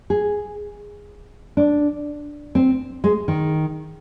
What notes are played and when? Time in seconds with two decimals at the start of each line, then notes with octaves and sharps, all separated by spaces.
0.10 G#4
1.57 D4
2.55 C4
3.04 G#3
3.28 D#3